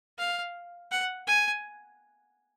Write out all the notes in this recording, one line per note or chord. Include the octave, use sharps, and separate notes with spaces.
F5
F#5
G#5